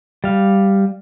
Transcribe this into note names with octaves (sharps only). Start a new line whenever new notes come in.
G3 F5